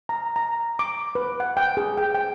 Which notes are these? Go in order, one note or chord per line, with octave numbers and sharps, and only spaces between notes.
A#5
A#5
D6
B4
F#5
G5
G#4
G5
G5